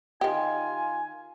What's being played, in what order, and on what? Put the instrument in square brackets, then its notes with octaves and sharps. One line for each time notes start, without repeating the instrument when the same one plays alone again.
[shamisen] D#3 G4 [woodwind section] F4 G#5